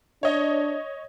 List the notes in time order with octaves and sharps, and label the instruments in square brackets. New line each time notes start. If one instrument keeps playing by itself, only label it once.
[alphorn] D4 [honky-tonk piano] C#5 D#5